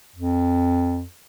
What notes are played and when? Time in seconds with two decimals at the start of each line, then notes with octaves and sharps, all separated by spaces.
0.16 F2